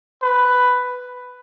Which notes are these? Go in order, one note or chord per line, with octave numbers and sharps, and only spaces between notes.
B4